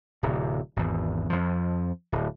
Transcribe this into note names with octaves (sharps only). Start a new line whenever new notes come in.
D1 C3
G#1 E2
F2 F3
D1